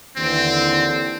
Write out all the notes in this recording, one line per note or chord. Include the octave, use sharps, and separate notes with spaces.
D#2 D3 E3 C4